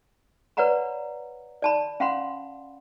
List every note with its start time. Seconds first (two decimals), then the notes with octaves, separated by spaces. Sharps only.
0.57 B4 C#5 D5 F#5 A#5 B5
1.62 D5 A5 B5
2.00 C#4 F5 F#5 B5 C6